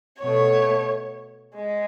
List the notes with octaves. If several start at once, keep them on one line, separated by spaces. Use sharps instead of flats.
B2 A3 C#5
G#3